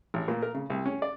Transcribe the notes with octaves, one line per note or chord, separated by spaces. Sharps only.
A1
A#2
A#4
C#3
C2
C#4
D5